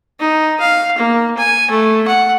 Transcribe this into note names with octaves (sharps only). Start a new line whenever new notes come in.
D#4
F5
A#3
G#5
A3
F#5